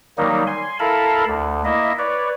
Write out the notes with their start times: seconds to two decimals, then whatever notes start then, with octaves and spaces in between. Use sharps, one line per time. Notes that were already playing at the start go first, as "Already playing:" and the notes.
0.18 D#3 F#3 G3 A#3 D#4
0.47 G#5 C6
0.79 E4 A4 A#4 F5 A5 B5
1.28 D2
1.65 A#3 E4 D#5 E5
1.98 B4 C#5 D5